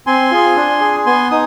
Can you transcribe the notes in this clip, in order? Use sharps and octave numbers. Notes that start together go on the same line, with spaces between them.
C4 G#5 C6
F4 G#4
D4
G#4
B3 G#5 C6
D#4 D#6